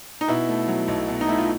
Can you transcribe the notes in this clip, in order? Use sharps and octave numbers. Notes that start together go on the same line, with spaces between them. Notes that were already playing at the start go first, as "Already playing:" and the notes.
D#4
B2 E4
A3
F#3
B1
B2
D#4
A3 E4
F4